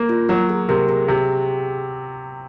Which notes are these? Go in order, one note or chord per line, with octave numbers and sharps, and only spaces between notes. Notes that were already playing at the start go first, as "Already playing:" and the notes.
Already playing: A#3
F4
F#3 F#4
G#4
C3 A#4
G#4
C3